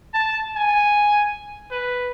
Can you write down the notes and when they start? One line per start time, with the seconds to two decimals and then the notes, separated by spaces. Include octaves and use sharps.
0.14 A5
0.57 G#5
1.71 B4